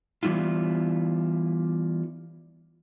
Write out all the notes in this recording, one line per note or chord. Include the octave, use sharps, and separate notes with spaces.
E3 G3 B3 E4 F4